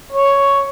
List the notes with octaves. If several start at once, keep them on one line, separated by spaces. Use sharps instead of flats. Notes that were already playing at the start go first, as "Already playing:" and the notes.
C#5